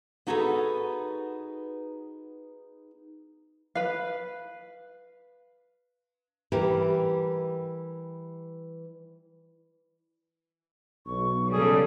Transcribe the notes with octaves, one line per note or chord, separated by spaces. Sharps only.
B3 D#4 F#4 G#4 A4 B4
B4 F5
E3 G3 G4 A#4
B1 C#6
C#3 G3 G#4 A4